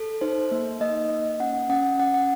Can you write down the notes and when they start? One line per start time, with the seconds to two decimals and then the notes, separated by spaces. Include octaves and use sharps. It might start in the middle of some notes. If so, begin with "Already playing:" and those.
Already playing: A4
0.21 D#4 C5
0.51 A#3
0.81 A#3 D#5
1.10 A#3
1.40 C#4 F#5
1.70 C#4 F#5
2.00 C#4 F#5
2.14 F#5